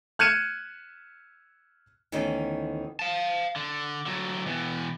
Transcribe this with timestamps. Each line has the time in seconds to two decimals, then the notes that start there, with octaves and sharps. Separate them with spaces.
0.19 F6 F#6 G#6 C#7 D#7 E7
2.12 D2 D#3 E3 B3 C#4 D#4
2.99 F5 A5
3.56 D3
4.06 D3 F#3
4.46 B2 E3